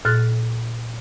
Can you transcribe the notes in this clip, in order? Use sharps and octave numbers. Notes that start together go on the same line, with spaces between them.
A#2 F6 F#6 A6